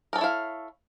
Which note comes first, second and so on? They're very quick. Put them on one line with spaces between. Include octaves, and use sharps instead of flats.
A#4 A4 C#5 E4 F5